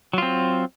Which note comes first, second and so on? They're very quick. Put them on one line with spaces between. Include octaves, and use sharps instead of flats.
F#3 F4 C4